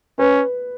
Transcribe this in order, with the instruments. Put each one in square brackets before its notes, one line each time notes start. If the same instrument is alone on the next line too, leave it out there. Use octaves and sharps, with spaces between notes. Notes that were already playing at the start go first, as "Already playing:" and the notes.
[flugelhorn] C#4 [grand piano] B4